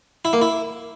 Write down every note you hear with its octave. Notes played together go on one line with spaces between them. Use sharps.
E4
A#3
E4